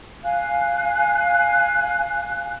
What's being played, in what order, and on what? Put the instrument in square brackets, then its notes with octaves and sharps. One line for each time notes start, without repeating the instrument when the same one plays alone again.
[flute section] F5 G#5 F#6